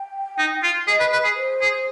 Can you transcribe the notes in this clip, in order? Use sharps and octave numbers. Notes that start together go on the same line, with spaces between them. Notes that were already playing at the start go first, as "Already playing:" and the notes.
Already playing: G5
D#4
F4
G#4 D#5
B4
B4
G#4
C5
G#4